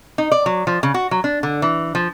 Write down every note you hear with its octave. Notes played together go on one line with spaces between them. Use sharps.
D#4
D5
F#3
F3
C#3
F#4
F#3
D4
D3
E3
F3